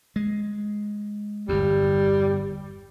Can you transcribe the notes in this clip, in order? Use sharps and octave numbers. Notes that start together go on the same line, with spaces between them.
G#3
G1 E2 G3